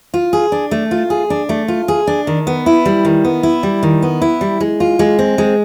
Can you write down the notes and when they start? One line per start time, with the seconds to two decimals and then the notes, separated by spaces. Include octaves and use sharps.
0.14 F4
0.33 G#4
0.52 D4
0.71 A3
0.91 F4
1.10 G#4
1.30 D4
1.49 A3
1.68 F4
1.88 G#4
2.07 D4
2.27 D#3
2.47 B3
2.66 E4
2.85 G3
3.05 D#3
3.24 B3
3.43 E4
3.63 G3
3.83 D#3
4.02 B3
4.22 E4
4.41 G3
4.60 G#3
4.80 F4
4.99 G#3
5.19 C4
5.38 G#3